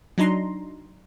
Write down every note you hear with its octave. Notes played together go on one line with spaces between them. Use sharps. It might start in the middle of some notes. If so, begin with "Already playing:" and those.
F#3 D4 D#4 A#5 C6